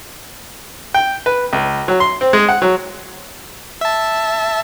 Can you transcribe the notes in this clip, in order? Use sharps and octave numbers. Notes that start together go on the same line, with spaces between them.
G5
B4
C#2
F#3
C6
C4
G#3
F#5
F#3
E5 A5